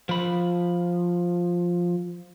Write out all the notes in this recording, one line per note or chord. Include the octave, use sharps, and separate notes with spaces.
F3 B5